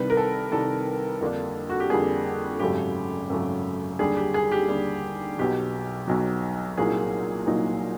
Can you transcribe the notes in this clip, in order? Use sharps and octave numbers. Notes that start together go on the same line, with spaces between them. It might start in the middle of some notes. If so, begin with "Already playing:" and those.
Already playing: C2 C3 D#3 G3 B4
A#4
A4
C2 C3 D#3 G3 A4
F2 D3 G3 A#3 D4
F#4
G4
F2 D3 G3 A#3 D4 G#4
G#1 F#2 C#3 F#3 A3 G4
G#1 F#2 C#3 F#3 A3
D#2 D3 G3 G#4
G4
G#4
G4
D#2 D3 G3
B1 B2 F#3 G4
B1 B2 F#3
C2 A#2 F#3 A#3 D#4 G#4
C2 A#2 F#3 A#3 D#4